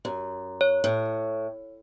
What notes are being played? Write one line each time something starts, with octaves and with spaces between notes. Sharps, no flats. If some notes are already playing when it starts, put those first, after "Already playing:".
F#2
C#5
A2